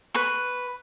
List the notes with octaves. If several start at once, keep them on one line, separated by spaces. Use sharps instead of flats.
B4 C#6